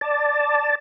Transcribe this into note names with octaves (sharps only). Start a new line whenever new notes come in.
D5 A5